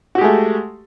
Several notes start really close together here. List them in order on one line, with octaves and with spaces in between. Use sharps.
F#4 G4 G#3 A3